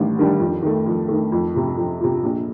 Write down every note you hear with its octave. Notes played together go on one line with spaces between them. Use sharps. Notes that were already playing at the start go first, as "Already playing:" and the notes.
Already playing: A1 D#3 G3 D4
G2 D#3 G3 D4
F2
D#3 A3
F2
D#3 A3
F2
C3 F3
F2
C3 F3
A#1